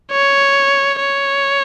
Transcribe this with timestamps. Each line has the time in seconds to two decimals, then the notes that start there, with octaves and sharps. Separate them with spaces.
0.12 C#5
1.00 C#5